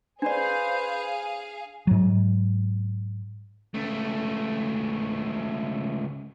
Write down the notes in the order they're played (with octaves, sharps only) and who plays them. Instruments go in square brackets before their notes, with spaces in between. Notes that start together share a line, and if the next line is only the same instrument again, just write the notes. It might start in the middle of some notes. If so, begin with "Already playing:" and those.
[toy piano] D4 D5 [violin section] G#4 F5 [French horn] B4 [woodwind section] C5
[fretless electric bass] G#2 F#3
[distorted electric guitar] C#2 A3